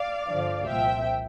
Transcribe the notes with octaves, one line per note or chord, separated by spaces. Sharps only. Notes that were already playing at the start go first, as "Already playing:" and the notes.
Already playing: D5 F5
G2 D3 F3
C2 A#2 F3 E5 G5